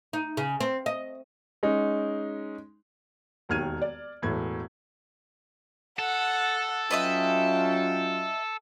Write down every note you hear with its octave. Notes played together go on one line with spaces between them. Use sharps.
D#4
C#3
C4
D#5
G#3 C#4 D#4
E1 D#2 D#3 F6 G#6 D#7
D5
E1 A2 E3 G#6
A4 F#5
F#3 C#4 F4 B4 D#5 E5 G5